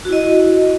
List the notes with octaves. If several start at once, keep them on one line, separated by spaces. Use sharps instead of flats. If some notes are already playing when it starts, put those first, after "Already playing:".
E4 F#4 D#5